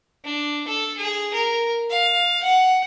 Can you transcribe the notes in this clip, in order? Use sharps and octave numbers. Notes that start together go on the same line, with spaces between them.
D4
A4
G#4
A#4
F5
F#5